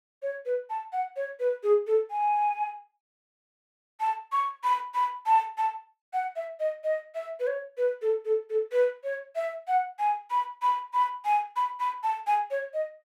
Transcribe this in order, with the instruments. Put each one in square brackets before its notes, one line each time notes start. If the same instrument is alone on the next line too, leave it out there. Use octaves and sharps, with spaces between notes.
[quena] C#5
B4
A5
F#5
C#5
B4
G#4
A4
G#5
A5
C#6
B5
B5
A5
A5
F#5
E5
D#5
D#5
E5
B4
C#5
B4
A4
A4
A4
B4
C#5
E5
F#5
G#5
B5
B5
B5
G#5
B5
B5
A5
G#5
C#5
D#5